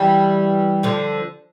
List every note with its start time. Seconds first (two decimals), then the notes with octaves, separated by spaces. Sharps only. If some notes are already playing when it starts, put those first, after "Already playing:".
Already playing: E3 G3
0.83 D3 F3